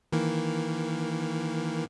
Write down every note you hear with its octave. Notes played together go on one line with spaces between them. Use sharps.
D#3 E3 A#3